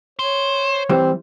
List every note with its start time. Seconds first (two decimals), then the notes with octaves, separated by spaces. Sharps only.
0.19 C5 C#5
0.90 E3 G3 C4 C5